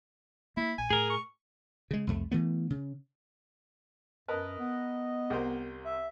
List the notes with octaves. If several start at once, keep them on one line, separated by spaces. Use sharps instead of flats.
A#3 E4
A#1 G#5
A2 G#4 A#4
C#6
C#3 G#3
C2 F2 A3
E3 A3 B3
C#3
F#2 A#4 B4 D#5 A5
B3
C2 A#4 C5
E5